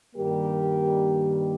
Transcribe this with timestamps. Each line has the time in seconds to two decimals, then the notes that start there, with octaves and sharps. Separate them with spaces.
0.15 G2 D#3 G3 A#3 G4 A#4